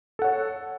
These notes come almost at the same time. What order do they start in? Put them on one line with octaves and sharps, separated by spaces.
A4 F#5 C#5